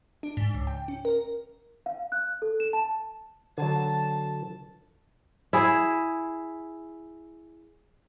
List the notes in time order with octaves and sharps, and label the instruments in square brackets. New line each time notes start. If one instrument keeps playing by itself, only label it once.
[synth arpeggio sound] D4
G#2
C#2
G5
C#4
A#4
[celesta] F5
F#6
A4
E7
A5
[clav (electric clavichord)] D3 F#3 [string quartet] A5
[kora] E4 G#4